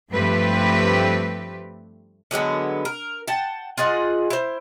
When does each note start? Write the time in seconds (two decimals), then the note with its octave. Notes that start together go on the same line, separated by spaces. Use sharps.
0.12 G2 F3 A3 C4 G4 B4
2.31 D3 F#3 G#3 B3
2.85 A#4
3.28 F#5 G5 A5
3.78 F4 G#4 D#5 F#5
4.30 E4 C5